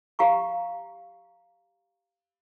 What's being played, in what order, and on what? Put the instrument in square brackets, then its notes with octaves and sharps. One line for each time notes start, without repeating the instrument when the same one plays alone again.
[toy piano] G4 F5 A#5 C#6